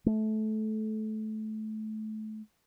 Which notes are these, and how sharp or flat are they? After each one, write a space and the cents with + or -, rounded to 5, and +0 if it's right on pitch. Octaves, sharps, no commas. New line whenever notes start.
A3 -20